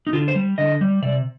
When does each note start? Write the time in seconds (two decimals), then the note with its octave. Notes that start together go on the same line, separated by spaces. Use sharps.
0.07 D#4
0.13 D3 F4
0.28 C5
0.35 G3
0.58 D3 D#5
0.81 G3
1.02 C3 D5